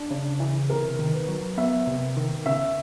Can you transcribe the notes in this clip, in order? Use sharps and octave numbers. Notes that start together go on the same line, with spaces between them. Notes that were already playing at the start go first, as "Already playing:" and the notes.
Already playing: D4
C#3
E3
C3 A#4
D#3
B4
F#3
B3 E5
C3
D#3
C#3 E5